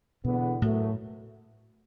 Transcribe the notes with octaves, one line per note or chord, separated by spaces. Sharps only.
E2 B2 D3 B3
F#2 A2 F#3 A3